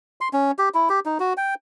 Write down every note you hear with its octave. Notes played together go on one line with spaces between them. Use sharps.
C6
C#4
G4
E4
G4
D#4
F#4
G5